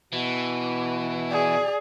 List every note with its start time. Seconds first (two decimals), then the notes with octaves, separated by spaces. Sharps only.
0.13 B2 E3
1.31 G#4 D5